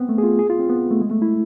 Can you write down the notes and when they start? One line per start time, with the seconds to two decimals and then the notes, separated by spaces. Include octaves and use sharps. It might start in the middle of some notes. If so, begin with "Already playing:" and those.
Already playing: B3 C4
0.09 A3
0.18 G#4
0.23 F4
0.39 G#4
0.50 F4
0.59 C4
0.69 B3
0.91 A3
1.01 G#3
1.11 A3
1.22 E4